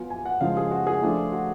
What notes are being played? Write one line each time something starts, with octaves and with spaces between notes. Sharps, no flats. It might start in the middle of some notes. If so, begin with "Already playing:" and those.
Already playing: F#3 B3 F4 G#5
G#5
F#5
C#3 F3 G#3 F5
G#4
F#4
G#4
F3 A3 D4 F4
F#4